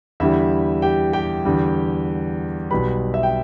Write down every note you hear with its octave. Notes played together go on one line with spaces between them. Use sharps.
E2 D3 G3 E4 E5
G4 G5
G4 G5
E2 D3 G3
B1 B2 G3 B4 B5
E5
G5